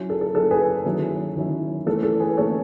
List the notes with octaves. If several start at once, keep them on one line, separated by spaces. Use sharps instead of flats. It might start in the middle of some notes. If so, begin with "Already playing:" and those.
Already playing: F#3 C#4 E4
A4
A4
F#3 C#4 E4 A4
G#4 B4
D#3 F#3 C#4 E4
D#3 F#3 C#4 E4
E3 A3 C#4 A4
A4
G#4 B4
E3 A3 C#4 A4 C#5